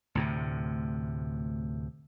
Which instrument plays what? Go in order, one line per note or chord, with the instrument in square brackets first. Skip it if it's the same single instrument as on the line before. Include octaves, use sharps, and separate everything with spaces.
[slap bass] D2 A2 C3